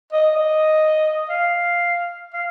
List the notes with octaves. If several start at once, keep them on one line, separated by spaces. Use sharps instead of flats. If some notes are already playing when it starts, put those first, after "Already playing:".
D#5
D#5
F5
F5